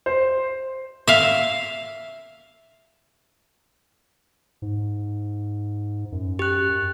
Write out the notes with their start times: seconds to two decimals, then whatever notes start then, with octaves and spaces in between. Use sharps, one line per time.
0.06 C5
1.07 E5 F5
4.62 G#2
6.12 F#2
6.39 G4 F#6